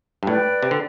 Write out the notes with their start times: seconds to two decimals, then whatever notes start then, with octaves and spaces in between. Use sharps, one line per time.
0.23 G2
0.27 A2 B4 D5 G5
0.63 C3
0.71 D3